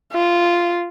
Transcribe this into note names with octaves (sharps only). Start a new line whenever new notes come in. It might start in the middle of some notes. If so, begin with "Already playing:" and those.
F4